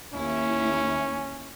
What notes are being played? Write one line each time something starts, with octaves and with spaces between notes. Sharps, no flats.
D#2 C#4 E4